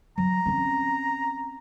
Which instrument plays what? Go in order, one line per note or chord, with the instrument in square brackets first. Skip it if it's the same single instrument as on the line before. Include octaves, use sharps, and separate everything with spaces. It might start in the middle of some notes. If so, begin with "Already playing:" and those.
[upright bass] F#3 [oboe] A#5
[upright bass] C4 C#4